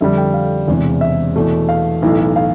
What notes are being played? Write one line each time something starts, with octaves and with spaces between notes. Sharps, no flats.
F2 D3 G3 E5
G5
F5
E1 E2 C3 E3
E5
E2 B2 A3
F5
B1 A2 E3 A3
F5